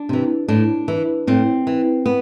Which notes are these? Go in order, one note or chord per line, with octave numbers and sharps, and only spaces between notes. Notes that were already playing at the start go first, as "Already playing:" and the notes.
Already playing: D4
C3 E3
A2 D4
E3
A2 C4
E3
B3